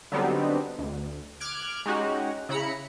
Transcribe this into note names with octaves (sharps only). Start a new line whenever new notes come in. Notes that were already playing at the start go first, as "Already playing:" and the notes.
D3 F#3 G3 B3 C4 D#4
D2
D6 F6 F#6 G#6 D7
G#3 C#4 D#4 F#4 G4
C#3 E4 A#5 B5 C#7